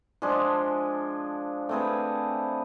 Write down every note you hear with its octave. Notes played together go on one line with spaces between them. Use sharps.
F3 G#3 D4 G#4
A3 C4 G#4 B4